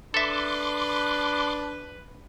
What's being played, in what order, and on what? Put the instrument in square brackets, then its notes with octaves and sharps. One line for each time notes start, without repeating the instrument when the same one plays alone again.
[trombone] D4 [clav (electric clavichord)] A4 E5 [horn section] B4 [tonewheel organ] C6 D6